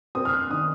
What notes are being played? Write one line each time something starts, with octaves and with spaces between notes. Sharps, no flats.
C4 D#6
F6
F#6
D#3 D#6